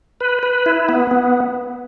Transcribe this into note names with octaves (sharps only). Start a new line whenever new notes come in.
B4
B4
E4
B3
B3